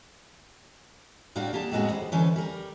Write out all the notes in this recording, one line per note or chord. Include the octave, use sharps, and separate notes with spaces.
A2 G3 D4 F#4 F5 G5
A#3 G4 G#4 A5
F2 A2 F#3 G#3 B3 F#4
D#2 G3 C5
D3 E3 C#4 A4 B4 C5
G3 A#4